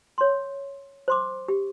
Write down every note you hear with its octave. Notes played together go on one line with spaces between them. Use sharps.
C#5 C6
C5 C6 D6
G4